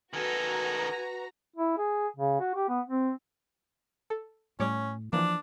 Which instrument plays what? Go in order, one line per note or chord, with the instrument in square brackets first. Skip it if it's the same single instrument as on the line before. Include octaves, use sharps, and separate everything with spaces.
[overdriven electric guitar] D#3 A4 [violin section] F#4 A#5 [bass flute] B4 [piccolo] G#5
[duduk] E4
G#4
C#3
F#4
G4
B3
C4
[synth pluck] A4
[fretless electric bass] A2 [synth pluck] G3 C#5 D6 [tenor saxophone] C#4
[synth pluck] E3 A#3 [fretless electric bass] F3 [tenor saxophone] D4